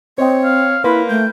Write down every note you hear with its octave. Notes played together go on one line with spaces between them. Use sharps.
C4 C5 C#5 D#5 G5
F5
A#3 E4 B4 F5 B5 C6
A3 G5